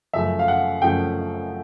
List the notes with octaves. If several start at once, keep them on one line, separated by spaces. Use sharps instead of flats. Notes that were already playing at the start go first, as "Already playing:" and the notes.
F#2 C#3 F3 A3 E5
F5
F#5
F#2 C#3 F3 A3 G5